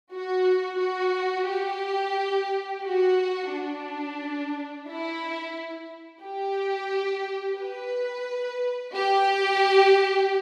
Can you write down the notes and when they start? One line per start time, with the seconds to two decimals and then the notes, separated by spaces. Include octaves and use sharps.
0.12 F#4
0.79 F#4
1.48 G4
2.84 F#4
3.51 D4
4.87 E4
6.23 G4
7.59 B4
8.94 G4